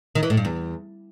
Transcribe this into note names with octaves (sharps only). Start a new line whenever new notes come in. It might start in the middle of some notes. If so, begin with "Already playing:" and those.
D#3
E3
A2
G2
E2